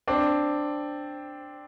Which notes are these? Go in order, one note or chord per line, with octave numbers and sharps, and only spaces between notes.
C4 D4